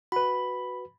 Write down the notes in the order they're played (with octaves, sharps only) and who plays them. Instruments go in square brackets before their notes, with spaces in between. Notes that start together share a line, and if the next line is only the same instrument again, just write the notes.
[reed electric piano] F#4 B4 [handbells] B5